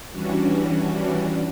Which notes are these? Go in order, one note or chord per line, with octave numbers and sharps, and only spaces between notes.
E3 G3 C#4 D4 F#4